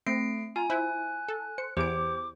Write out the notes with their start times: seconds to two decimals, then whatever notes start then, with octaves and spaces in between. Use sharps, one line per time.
0.07 A3 C4 C7 D7
0.56 F4 G#5 A#5
0.70 E4 C5 F#6
1.28 A4
1.58 C5 C#7
1.77 E2 G4 C5 D6 D7